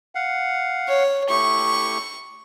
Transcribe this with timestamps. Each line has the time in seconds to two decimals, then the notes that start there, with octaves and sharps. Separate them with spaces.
0.15 F5 F#5
0.88 C#5
1.29 A3 E4 G4 C#6